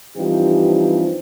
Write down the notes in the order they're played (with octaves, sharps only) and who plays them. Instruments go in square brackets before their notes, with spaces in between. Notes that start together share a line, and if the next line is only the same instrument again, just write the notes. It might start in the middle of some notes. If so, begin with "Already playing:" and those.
[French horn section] G2 E3 F3 C4 D#4 G4